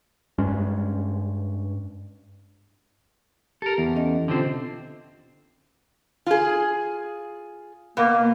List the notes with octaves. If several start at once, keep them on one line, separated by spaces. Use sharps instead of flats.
G2 G#3 C#4
G4 A4 A#4
E2
C#4 A4 D#5
B2 D3 C4 F4 C5
F4 G#4
B2 A#3